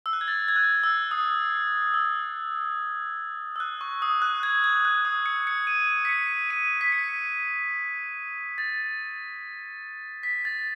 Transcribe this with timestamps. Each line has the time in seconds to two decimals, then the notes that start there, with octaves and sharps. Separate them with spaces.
0.06 E6
0.13 F#6
0.21 G#6
0.28 A6
0.48 G#6
0.56 F#6
0.84 E6
1.11 D#6
1.94 E6
3.56 E6
3.60 F#6
3.81 C#6
4.02 D#6
4.22 F#6
4.43 G#6
4.64 G#6
4.85 F#6
5.05 D#6
5.26 C#7
5.47 C#7
5.67 D#7
6.05 B6
6.09 C#7
6.50 D#7
6.81 B6
6.92 C#7
8.58 A6
10.23 B6
10.45 A6